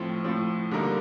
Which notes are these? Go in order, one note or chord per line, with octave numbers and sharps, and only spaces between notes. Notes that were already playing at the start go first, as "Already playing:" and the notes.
Already playing: A2 F3 C4
A2 F3 C4
D3 G3 A#3 D#4 A#4